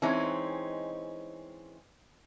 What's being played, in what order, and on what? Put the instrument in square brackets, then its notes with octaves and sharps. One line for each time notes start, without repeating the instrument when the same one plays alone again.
[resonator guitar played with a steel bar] E3 G#3 C4 C#4 D#4